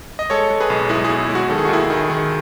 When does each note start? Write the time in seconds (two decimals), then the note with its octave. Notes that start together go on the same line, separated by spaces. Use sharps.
0.19 D#5
0.30 G#3 A4 C#5
0.50 G#3
0.60 G#4 B4
0.70 B1
0.89 G#3 E4 G#4
1.04 B2 E4 G#4
1.19 E4
1.30 G#3
1.35 F#4
1.50 D#3 A4
1.58 G#4
1.65 F#4
1.69 D#2 E4 G#4
1.90 D#3
2.10 D#3